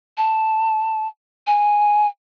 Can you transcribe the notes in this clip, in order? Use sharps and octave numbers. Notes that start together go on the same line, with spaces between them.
A5
G#5